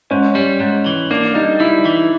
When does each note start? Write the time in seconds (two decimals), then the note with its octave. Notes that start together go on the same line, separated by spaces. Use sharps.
0.11 G#2 C#4
0.35 G3
0.60 G#2
0.86 E3
1.10 A#3 D4
1.35 G3 D#4
1.60 G3 E4
1.85 E3